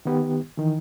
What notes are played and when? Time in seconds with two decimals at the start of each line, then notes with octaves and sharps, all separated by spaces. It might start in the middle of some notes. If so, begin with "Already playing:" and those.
0.05 D#3 B3 G4
0.57 D#3 E3